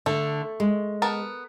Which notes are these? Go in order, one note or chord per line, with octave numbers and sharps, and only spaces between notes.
D3 A3
G#3
B3 A#4 A5